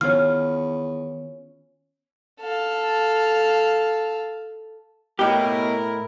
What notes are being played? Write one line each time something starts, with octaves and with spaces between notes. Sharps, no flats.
E2 D#3 B3 C#4 F4 F6
A4 F5
A2 B3 E4 G4 A#4 D#5